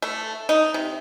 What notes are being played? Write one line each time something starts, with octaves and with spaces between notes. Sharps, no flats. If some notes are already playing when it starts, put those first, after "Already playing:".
A3
D#4
C3